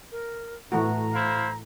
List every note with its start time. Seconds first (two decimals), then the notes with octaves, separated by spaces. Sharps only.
0.12 A#4
0.72 A2 E3 A3 F#4 A#5
1.13 E4 C5 F5